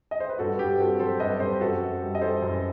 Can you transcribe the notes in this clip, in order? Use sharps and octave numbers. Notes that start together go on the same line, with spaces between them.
D#5
C5
B4
G2 F#4 A4
G2 G4
C4 F#4 A4
F#3 A4 C5
G2 B4 D#5
G2 A4 C5
F#2 F#4 A4
F#2
G3
D#5
E3 A4 C5
F#2